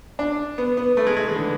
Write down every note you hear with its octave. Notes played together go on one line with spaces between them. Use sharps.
D4
B3
B3
A3
G#3
G#3
E3
D3